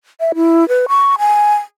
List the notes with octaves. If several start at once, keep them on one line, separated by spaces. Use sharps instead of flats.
E5
E4
B4
C#6
G#5